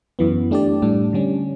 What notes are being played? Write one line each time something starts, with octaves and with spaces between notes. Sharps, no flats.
F#2 E3 B3
A3 D4 G4 D5
A2 G3 D4
D3 G3 C#4